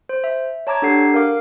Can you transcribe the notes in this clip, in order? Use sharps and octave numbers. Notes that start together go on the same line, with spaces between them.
C5
E5
C#5 A5 A#5 D6 G#6
D4 G4 A4 F#5 C7
A#4 F5 D6